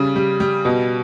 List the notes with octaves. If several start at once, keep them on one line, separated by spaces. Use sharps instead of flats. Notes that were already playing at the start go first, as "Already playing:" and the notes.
Already playing: C#3 G3
G3
G3
B2